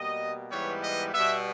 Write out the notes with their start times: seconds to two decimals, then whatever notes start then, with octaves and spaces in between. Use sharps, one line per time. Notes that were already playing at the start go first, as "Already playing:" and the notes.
Already playing: B2 G3 A#3 D#5
0.51 G#2 E3 G3 B3 C#5
0.82 D#5
1.14 B2 G3 B3 E5